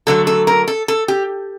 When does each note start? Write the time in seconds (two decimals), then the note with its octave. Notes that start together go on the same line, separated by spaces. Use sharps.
0.07 D3 F#3 A3 A4
0.27 A4
0.47 A#4
0.68 A4
0.88 A4
1.08 G4